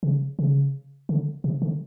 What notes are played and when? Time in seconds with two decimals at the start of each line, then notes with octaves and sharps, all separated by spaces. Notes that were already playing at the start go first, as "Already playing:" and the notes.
0.03 C#3
0.39 C#3
1.09 D3
1.44 C3
1.62 D3